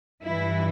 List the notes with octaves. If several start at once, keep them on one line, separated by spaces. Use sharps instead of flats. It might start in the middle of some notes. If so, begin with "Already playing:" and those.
G2 E3 E4